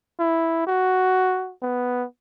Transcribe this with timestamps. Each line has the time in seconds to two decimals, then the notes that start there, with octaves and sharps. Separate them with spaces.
0.19 E4
0.67 F#4
1.62 B3